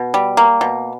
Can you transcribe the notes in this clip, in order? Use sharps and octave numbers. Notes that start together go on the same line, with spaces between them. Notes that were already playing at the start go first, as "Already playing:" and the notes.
Already playing: B2
G3
A#3
B2